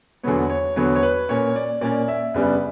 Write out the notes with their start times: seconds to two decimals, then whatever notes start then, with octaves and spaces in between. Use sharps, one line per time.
0.23 E2 D3 F#3 B3 C#5
0.50 C#5
0.76 E2 D3 F#3 B3 C#5
0.95 C#5
1.03 B4
1.29 A#2 A#3 C#4 C#5
1.56 D5
1.81 A#2 A#3 C#4 D5
2.08 E5
2.34 F#2 C#3 G3 B3 D4